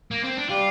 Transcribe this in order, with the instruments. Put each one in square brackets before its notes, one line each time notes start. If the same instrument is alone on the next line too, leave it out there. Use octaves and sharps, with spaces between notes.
[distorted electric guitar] A#3
C4
D4
[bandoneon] G3 G4 [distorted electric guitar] F4